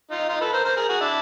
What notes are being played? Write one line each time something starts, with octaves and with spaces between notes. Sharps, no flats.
D#4 F4
D#4 F4
A4 B4
A#4 C5
A#4 C5
G#4 A#4
F#4 G#4
D4 E4